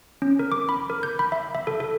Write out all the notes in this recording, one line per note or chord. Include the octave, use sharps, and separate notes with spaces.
C#4
A#4
D6
B5
A#4
G6
B5
E5
E5
A4
A4